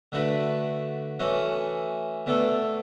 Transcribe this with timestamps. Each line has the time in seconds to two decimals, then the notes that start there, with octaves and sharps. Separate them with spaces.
0.12 D3 A3 D4 F#4 B4
1.19 E3 A3 C#4 F#4
2.26 B2 A3 D4 A4